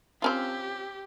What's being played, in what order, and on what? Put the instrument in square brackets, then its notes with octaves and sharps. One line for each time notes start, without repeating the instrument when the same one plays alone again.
[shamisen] C4 C#4 F4 [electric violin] G4